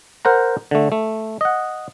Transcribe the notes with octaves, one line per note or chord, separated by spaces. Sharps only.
A#4 C5 F#5 A#5
D3 A3
A3
D#5 F#5